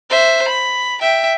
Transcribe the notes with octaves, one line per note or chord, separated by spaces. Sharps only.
C5 E5
B5
E5 G5